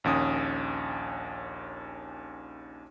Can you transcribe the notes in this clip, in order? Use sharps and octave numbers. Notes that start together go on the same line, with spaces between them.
A#1 D#2 C#4 D#6